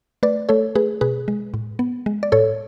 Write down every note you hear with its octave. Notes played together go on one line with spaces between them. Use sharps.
A3 B4 D5
A3 A4 C#5
A3 G#4 B4
B2 G#4 B4
G#3
A2
B3
G#3
D5
A2 A4 C#5